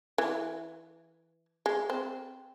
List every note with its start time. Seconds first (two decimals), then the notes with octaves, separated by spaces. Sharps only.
0.18 E3
1.66 G#3
1.90 C4